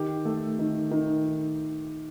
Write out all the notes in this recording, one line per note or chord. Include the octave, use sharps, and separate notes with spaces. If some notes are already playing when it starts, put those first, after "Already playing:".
Already playing: D#3 G4
A3
D#3
D#3